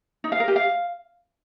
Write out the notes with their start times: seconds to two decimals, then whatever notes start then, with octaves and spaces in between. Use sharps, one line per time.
0.24 D#4
0.32 F5
0.40 A#4
0.48 G4
0.56 F5